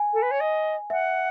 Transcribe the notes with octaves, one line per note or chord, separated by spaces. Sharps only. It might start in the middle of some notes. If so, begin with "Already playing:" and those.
Already playing: G#5
A4
B4
C#5
D#5
E5 F#5